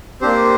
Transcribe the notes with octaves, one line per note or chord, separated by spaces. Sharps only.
A#3 C4 D4 G4 C5